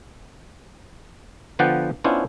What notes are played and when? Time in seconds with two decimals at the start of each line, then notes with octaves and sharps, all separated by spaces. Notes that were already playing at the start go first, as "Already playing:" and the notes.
1.59 D3 F3 B3 D5 F#5 G5
2.04 B3 C#4 D4 E4 F4 C5